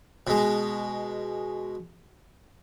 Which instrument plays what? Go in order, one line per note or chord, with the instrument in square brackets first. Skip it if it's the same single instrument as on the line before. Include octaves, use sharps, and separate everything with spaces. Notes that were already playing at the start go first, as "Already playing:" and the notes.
[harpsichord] B2 G#3